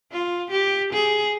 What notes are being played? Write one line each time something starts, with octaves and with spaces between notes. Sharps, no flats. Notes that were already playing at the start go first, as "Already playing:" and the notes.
F4
G4
G#4